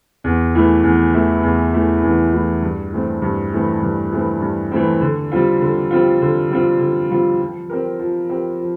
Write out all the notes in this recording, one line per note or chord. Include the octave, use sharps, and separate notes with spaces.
E2
E3 A3 E4
E2
E3 A3 E4
E2
E3 A3 E4
E2
E3 A3 E4
G2
E3 A3 C4
G2
E3 A3 C4
G2
E3 A3 C4
G2
E3 A3 C4
D3
G3 C4 F4
D3
G3 C4 F4
D3
G3 C4 F4
D3
G3 C4 F4
F3
C4 G4 A#4
F3
C4 G4 A#4
F3